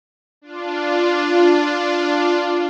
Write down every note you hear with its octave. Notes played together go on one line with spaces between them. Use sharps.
D4 F4